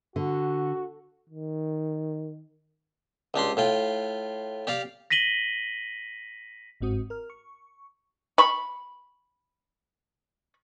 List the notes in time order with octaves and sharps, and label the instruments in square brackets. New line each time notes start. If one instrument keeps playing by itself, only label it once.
[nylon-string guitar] D3 [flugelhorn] F#4
[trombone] D#3
[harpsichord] C#2 D4 G4 C6
A2 F4 G5
G4 D5 F5 D6
[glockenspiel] A#6 B6 D#7 F#7 G7
[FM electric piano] G1 G#2 C4 F#4 D#6
A#4 F6
C#6
[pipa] B5 C#6